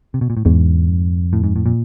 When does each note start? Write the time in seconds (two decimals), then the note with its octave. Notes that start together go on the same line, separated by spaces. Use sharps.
0.14 C3
0.21 B2
0.30 A#2
0.37 A2
0.45 E2 G#2
0.89 F2
1.33 A2
1.44 G#2
1.56 A2
1.66 A#2